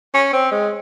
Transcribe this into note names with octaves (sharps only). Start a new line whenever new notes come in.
C#4
C4
G#3